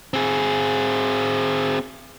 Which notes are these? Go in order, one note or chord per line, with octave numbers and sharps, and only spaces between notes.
C4 G#4